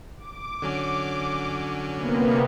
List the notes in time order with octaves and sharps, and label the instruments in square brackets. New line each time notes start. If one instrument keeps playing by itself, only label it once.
[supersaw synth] D6
[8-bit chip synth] D3 F#3 C#4
[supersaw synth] C3 A#3 B3